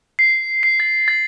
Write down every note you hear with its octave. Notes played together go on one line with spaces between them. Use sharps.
C7
C7
A6
A6